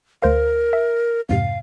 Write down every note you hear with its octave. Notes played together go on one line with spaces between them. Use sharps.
D2 A#4 C5 F5
E5
F2 G#2 C3 F5